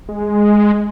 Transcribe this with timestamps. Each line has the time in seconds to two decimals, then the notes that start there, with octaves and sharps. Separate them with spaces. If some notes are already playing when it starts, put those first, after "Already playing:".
0.09 G#3